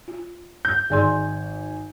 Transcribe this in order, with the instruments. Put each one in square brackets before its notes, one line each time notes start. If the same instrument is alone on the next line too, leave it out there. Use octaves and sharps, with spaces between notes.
[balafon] F4
[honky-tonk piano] G6
[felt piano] G#1 G#5 [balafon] G#4 D5 C6